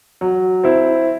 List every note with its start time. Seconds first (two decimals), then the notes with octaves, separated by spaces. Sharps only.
0.21 F#3
0.64 C4 E4